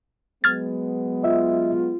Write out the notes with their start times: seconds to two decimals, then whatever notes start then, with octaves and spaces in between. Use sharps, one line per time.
0.44 F#3 G#3 B3 F6 G#6 A6
1.23 F4 D#5 E5